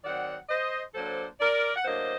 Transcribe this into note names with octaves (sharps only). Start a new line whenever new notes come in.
D#3 F#3 C4 D5 F#5
C5 D#5
F#3 A#3 D4 A4 C5
A#4 D5
F#5
A2 F#3 A#3 D4 C5 D#5